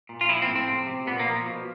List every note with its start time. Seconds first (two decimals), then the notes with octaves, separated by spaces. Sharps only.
0.09 A#2
0.21 F4
0.29 F3 E4
0.42 C4
0.48 A2
0.56 C4
0.68 C3
0.87 C3
1.07 A#2 B3
1.20 A#3
1.27 F3
1.46 B2